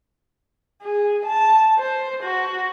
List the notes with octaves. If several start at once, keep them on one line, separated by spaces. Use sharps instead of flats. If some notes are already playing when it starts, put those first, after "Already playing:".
G#4
A5
C5
F#4